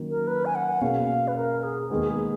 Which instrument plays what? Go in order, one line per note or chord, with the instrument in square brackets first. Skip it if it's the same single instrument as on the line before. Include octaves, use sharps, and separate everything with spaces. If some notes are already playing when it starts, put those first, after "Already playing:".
Already playing: [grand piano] D#3 F#3 A#3 C#4
[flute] A#4
B4
G#5
F#5
[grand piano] B2 A#3 C#4 G#4 [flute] F5
[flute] B4
A#4
G#4
[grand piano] D#2 D#3 G#3 B3 [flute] G#4
[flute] G#4